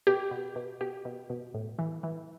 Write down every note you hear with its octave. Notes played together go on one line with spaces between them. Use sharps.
B2 G4
B2
B2
B2 G4
B2
B2
A2
E3
E3